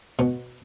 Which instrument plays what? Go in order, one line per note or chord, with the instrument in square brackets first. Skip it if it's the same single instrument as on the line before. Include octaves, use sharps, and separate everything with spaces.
[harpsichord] B2